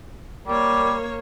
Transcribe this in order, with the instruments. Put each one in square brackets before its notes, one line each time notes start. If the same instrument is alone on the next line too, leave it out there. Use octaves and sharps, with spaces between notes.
[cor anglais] G3 [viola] A#3 C#5